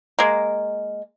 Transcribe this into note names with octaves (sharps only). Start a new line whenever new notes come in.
G#3 A#3